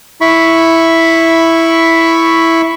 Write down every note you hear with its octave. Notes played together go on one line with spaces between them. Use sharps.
E4 B5 C#6